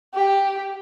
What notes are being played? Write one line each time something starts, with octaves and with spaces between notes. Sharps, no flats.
G4